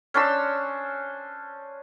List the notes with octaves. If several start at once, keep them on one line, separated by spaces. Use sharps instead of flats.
C#4 D4 C5 E6